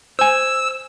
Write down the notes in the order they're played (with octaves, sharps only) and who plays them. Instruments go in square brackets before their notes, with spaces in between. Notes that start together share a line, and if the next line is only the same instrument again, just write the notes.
[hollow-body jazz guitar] C5 G#5 [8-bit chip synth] E6